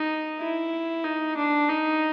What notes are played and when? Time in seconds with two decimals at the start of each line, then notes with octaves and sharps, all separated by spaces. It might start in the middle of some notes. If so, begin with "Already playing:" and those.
Already playing: D#4
0.39 E4
1.04 D#4
1.37 D4
1.69 D#4